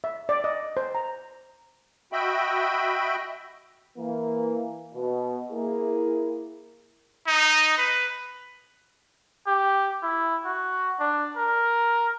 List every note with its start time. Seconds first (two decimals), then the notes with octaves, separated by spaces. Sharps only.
0.04 E5
0.29 D5
0.44 D#5
0.77 C5
0.95 A#5
2.12 F#4 D#5 E5 G5 B5
3.98 E3 A#3
4.95 B2
5.51 A#3 E4 G#4
7.27 D#4
7.78 B4
9.47 G4
10.03 E4
10.45 F#4
11.00 D4
11.37 A#4